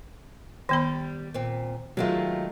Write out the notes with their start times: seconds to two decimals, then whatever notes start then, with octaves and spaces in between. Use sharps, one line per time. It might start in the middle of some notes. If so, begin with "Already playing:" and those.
0.69 D#3 G3 B3 B5
1.34 A#2 C4
1.97 D#3 F#3 G#3 A3 F4